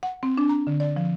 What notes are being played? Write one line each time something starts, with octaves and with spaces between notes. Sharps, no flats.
F#5
C4
D4
A#5
D3
D5
F3